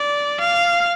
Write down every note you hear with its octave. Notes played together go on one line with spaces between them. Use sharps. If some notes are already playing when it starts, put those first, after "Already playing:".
Already playing: D5
F5